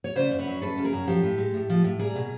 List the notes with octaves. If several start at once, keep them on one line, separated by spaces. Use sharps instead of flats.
C#5
C#3 C5 D5
F#2
B4 C#5
F#3
F#2 A4 B4
C#3
G#4 A#4
F#2
F3 G4 A4
A2
G#3
A2
F3
A2
G3 G#4 A#4
B2